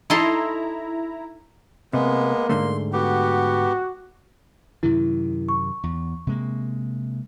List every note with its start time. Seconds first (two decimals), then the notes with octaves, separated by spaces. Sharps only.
0.10 D#4 E4 A4 A#5 C6
1.93 C3 G#3 A#3 B3
2.49 G#2 D3 A3 C6
2.93 B3 F#4 G4
4.83 F#2 C3 D#3 E4
5.49 C#6
5.83 E2
6.27 C3 G#3 A#3